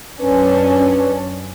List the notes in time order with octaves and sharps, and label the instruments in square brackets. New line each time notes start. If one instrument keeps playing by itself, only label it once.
[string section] F#2 C#4 D4 [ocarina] B4